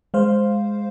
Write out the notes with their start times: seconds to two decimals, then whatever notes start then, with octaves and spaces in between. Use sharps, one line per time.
0.14 G#3 C5 F5